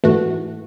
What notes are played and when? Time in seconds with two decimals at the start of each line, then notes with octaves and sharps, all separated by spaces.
0.04 G#2 E3 A3 F#4